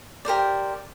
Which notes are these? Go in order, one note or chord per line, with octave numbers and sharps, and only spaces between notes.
G4 A#4 C5 D5